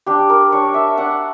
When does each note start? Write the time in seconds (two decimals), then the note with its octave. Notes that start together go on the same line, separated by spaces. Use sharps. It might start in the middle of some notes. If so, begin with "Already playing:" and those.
0.06 D4 G4
0.29 A#4
0.52 D4 C#5
0.74 E5
0.97 D4 F#5